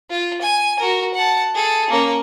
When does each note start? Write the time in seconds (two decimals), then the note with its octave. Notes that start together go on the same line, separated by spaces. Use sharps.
0.10 F4
0.42 G#5
0.80 F#4 A#4
1.14 F#5 A5
1.55 G#4 A4
1.90 A#3 C#4